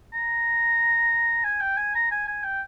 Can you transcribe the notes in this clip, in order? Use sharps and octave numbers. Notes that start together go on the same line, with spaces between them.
A#5
G#5
G5
G#5
A#5
G#5
G#5
G5